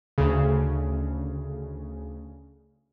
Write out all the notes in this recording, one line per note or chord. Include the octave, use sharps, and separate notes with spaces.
D2 C#3